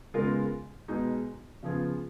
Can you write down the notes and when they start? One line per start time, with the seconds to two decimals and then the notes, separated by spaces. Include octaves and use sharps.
0.14 C#3 G#3 B3 F4 A#4
0.88 B2 G#3 D#4
1.63 C#3 F3 B3 F4 G#4